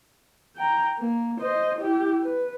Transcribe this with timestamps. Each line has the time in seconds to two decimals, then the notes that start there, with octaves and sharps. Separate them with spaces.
0.56 G5 A#5
0.99 A#3
1.40 C5 D#5
1.79 E4 G4
2.24 B4